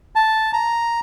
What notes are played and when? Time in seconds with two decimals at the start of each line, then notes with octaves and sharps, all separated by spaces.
0.16 A5
0.53 A#5